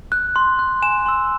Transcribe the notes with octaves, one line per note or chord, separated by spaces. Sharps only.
F#6
C6
F#6
G#5 E7
C6 E6